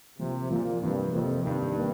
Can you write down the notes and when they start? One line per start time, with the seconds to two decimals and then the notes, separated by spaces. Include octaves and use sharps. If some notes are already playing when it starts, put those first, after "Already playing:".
0.19 C3 F3 A#3 F4
0.50 A#2 F3 A#3 F4
0.81 G2 C3 F3 A#3
1.13 F2 C3 F3 A#3
1.44 G2 C3 D#3 A#3 D#4
1.75 D#3 A#3 D#4